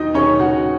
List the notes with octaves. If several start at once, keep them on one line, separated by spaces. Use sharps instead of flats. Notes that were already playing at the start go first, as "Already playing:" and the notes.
Already playing: D#2 F#3 D#4 D#5
D#2 C#4 C#5
C#3 F#4 F#5